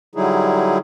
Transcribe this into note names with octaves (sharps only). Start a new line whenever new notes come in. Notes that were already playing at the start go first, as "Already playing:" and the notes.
D3 F#3 G3 D#4 E4 G#4